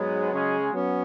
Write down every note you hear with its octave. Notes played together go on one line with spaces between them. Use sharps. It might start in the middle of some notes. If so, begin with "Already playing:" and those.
Already playing: G#2 F#3 G#3 B3 G#4
C#3 G#3 C#4 G#4
F#3 B3 C#4